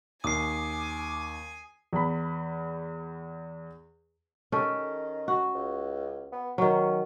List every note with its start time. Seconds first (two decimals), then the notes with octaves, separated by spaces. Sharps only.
0.24 D#2 G#5 D6 D#6 C7
1.93 E2 B5
4.52 D#3 C#4 G4 A4
5.28 F#4
5.54 C#2
6.32 B3
6.58 D#3 F#3 C#4